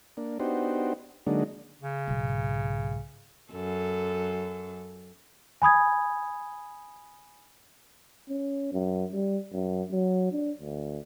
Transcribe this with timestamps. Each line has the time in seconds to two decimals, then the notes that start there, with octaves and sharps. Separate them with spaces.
0.17 A#3 D4
0.40 B3 D4 D#4 F#4 G4 C5
1.27 D3 F#3 G#3 A#3 D4 D#4
1.82 C#3
2.08 B1 G#2
3.52 F#2 A4
5.62 G#5 B5 D#6 G#6
8.29 C#4
8.73 F#2
9.12 G3
9.53 F#2
9.91 F#3
10.32 D4
10.61 D2